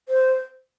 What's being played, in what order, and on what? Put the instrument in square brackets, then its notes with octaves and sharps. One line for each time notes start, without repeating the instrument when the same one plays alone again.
[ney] C5